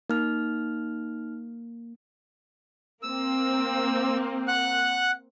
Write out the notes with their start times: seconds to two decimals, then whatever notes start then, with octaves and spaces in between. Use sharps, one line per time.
0.10 A#3 D#4 F6
3.03 A#3 C4 E6
4.48 F#5 F#6